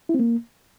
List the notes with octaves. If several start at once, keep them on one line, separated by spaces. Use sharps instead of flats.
E4
C4
A#3